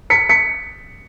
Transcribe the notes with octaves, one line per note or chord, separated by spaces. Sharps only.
B6 C#7
B6 C#7